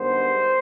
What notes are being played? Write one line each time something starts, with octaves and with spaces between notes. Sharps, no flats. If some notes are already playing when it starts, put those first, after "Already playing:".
Already playing: G2 D#3 G#3 B3 C5